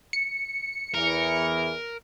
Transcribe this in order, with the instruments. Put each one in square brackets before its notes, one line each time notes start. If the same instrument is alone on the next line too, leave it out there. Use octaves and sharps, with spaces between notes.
[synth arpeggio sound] C#7
[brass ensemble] E2 E3 [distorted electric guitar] A#4